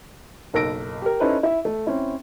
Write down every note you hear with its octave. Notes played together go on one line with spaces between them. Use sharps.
F#1 B1 A#4 E6 A#6 D7
G4 A#4
C#4 D#4 E4 A4 B4 C5
E4 E5
A3
C4 C#4 E4